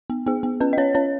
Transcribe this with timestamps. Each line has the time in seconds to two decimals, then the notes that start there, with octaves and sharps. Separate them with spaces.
0.10 B3
0.26 B3 G#4
0.43 B3
0.60 C#4 B4
0.73 D#5
0.78 C#4 C#5
0.95 C#4 C#5